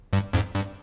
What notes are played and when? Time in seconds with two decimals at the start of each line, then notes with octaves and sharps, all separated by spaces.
0.13 G2
0.33 F2 G#2
0.55 G2